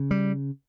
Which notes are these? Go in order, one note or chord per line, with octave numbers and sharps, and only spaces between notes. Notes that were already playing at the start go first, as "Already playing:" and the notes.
Already playing: C#3
G3